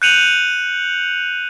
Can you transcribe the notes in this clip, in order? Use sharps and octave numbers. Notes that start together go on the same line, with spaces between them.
F#6 G6 C#7 D#7 F7 F#7